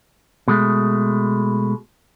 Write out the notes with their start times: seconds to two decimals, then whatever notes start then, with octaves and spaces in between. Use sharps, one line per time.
0.48 B2 G#3 A3